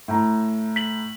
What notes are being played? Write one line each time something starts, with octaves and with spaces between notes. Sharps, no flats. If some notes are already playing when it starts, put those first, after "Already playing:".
A2 A#5
B6 F#7